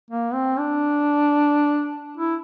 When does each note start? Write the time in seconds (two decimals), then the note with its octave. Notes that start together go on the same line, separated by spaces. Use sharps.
0.11 A#3
0.34 C4
0.58 D4
2.17 E4